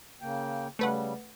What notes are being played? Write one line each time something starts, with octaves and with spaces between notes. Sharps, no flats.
C#3 A#3 G5
C#3 G3 A3 B4 F#5